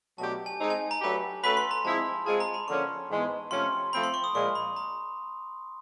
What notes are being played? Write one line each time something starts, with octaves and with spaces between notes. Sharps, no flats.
B2 F#3 A3 D4 G4 A5
G#5
G#3 C4 D#4
G#5
A#5
F#3 A3 D4 G4 B4
A3 C#4 F#4 B4 B5
C6
A#5
F3 G#3 C4 E4 G#4 A5
G#3 C4 F4 G#4 A5
A#5
B5
D3 F3 A#3 C#4 C#6
G#2 E3 G#3 B3
C3 F3 A3 C#4 C6
F3 A3 C4 B5
C6
C#6
D#6
A#2 F3 G#3 C#6
B5
A#5